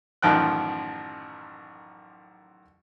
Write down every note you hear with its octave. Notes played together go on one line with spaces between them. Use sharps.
A1 F#2 D#3 F3 G5 F#6